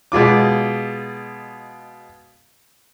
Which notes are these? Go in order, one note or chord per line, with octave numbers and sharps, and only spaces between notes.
B2 G#3 F4 D6